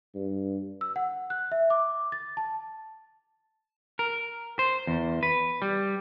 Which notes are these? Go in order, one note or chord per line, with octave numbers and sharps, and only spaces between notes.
G2
E6
F#5
F#6
E5
D6
A6
A5
A#4
C5
E2
B4
G3